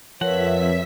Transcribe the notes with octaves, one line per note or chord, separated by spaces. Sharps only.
F2 F3 A#4 B4 C#5 E5 F#5 B6